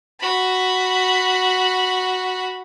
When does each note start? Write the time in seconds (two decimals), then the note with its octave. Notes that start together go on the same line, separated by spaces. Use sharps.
0.20 F#4 B5